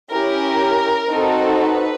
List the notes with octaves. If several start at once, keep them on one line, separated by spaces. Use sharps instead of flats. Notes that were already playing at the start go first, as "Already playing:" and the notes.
C#4 E4 G4 A#4
C4 D#4 F#4 A4
B4